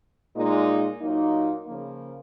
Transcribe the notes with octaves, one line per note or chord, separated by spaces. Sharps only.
A#2 G#3 D#4
A#2 F#3 A#3 D#4
C#3 F3 A#3